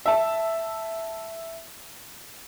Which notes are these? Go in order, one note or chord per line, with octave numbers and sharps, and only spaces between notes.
E5 A5